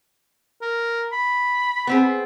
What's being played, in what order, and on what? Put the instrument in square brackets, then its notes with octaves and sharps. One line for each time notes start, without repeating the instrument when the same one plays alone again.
[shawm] A#4
B5
[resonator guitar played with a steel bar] B3 C4 G#4